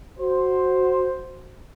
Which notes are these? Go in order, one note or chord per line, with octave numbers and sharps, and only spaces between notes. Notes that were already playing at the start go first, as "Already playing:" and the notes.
F#4 C5